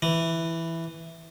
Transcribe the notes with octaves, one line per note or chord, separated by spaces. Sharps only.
E3